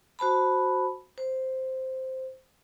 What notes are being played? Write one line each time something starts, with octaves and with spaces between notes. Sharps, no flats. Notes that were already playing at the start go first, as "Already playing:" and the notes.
F#4 C5 A5 B5
C5